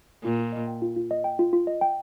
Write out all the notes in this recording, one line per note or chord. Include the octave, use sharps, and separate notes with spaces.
A#2 F4
F4
D#5
G5
F4
F4
D#5
G5
F4
F4
D#5
G5